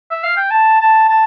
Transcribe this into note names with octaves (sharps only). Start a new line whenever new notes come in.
E5
F5
G5
A5
A5
A5